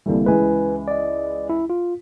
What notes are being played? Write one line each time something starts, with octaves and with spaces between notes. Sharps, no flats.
C2 D3 E3 G3 A#3
C#2 E3 G#3 B4 G#5
D5 D#5
E4
F4